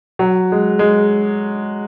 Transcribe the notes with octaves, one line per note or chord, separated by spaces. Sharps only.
F#3
G#3
G#3